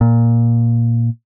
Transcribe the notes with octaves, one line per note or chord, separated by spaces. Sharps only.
A#2